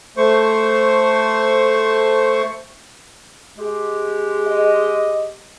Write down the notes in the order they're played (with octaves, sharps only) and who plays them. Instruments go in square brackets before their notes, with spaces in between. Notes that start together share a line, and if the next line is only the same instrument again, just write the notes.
[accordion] A3 C5 C#6
[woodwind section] G#3 G4
[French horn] D#5